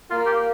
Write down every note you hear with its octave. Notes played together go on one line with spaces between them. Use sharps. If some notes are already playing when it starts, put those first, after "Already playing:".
A#3 F4
G4